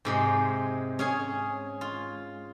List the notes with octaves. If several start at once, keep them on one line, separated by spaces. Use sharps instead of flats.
G#2 C3 G#3
C#4 G#4 G#5
F4